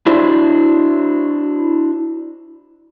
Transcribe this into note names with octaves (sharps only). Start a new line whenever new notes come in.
D4 E4 F#4 C5